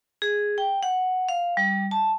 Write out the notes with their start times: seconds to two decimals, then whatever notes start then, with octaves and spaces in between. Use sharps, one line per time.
0.22 G#4
0.58 G5
0.83 F#5
1.29 F5
1.57 G3
1.91 A5